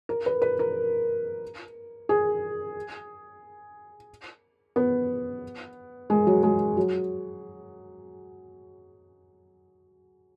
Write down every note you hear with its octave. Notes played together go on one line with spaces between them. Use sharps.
A#4
B4
B4
A#4
G#4
B3
G#3
F#3
G#3
F#3